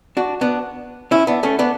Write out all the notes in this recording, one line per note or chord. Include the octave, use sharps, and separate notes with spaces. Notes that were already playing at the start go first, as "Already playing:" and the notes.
D4 F#4
B3 D4
C#4 E4
B3 D4
A3 C#4
B3 D4